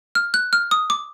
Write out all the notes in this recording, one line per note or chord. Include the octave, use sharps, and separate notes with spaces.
F6
F#6
F6
D#6
D6